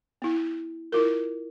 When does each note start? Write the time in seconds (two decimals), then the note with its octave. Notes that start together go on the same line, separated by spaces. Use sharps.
0.22 B3 E4
0.92 E4 F4 A#4